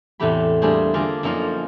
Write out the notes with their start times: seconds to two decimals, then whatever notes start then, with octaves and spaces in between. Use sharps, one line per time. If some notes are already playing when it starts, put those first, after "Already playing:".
0.20 E2 A2 C3 A3 G4 B5
0.62 G3 A3 A#3 D4 G#4 C5
0.94 D3 A#3 F4 G#4 D5
1.23 F#2 F3 A#3 D#4 F4 D5